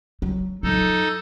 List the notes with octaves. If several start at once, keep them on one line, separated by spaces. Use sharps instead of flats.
F#3
F2 F#3 D#4 A4